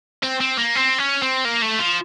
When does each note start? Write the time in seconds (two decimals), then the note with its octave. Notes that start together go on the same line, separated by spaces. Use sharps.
0.23 C4
0.40 C4
0.58 A#3
0.75 C4
0.98 C#4
1.22 C4
1.45 A#3
1.62 A3
1.79 F3